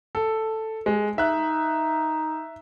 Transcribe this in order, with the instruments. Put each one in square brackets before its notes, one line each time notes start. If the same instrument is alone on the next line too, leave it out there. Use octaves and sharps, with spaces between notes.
[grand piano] A4
G#3
[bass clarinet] D#4 [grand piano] E5 F#6